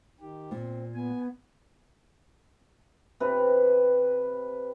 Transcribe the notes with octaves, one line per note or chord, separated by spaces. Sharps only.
D#3 G4
A#2 C4
B3 G#5
C3 B4